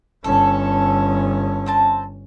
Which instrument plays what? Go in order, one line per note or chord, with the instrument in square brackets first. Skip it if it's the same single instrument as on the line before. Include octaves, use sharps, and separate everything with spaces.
[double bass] G1 C#4 [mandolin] A4
[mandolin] C4 C5 A5